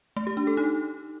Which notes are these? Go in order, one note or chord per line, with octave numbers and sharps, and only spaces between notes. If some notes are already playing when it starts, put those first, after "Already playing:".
A3
G4
D4
A4
D#4